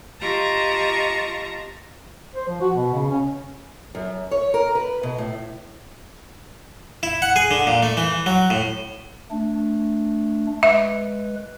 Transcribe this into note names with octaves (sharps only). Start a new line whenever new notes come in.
F4 G4 D#5 A5 A#5 C#6
C5
F3
F#4
B2
C#3
C#4
F#2
C#5
A#4
B4
B2
A2
E4
F#5
G#4
D3
A#2
A3
E3
F#3
A2
A3 D4
G#3 B4 E5